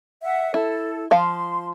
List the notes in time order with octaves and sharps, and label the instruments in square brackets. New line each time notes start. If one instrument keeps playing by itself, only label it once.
[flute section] E5 F#5
[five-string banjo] E4 [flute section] A4
[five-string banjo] F3 F5 [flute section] C6